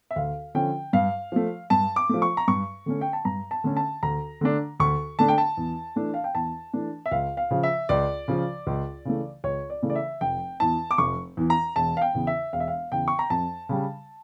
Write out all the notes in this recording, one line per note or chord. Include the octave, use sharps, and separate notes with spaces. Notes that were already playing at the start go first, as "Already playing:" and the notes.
E5
D2 F5
D3 F3 C#4 G5
G2 F5
F3 A3
G2 A5
D6
F3 A3
C#6
A#5
G2 C#6
D3 A3 C#4
G5
A5
G2 A#5
A5
D3 A3 C#4
A5
D2 A#5
D3 A3 D4
D2 C#6
D3 A3 D4 A5
G5
A5
E2
E3 A3 D4
F5
G5
E2 A5
E3 A3 D4
E5
C#2 F5
F5
C#3 F3
E5
C#2 D5
C#3 F3
C#2
C#3 E3 A3
C#2 C#5
D5
C#3 E3 A3
D5
E5
F1 G5
E2 E3 A5
D6
F1 C#6
E2 E3
A#5
E1 A5
F5
G5
E2 C#3
E5
E1 F5
E5
F5
E2 C#3 G5
C#6
A#5
F2 A5
C#3 G3